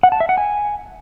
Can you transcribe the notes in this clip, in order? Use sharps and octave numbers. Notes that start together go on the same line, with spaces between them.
F#5
A5
E5
F#5
G#5